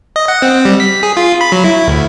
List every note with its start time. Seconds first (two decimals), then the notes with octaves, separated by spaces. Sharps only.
0.16 D#5
0.28 F#5
0.42 C4
0.65 G3
0.80 B6
1.03 G#4
1.17 F4
1.41 B5
1.52 F#3
1.64 E4
1.87 D2